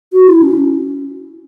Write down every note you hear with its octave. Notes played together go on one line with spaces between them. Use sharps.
F#4
E4
C#4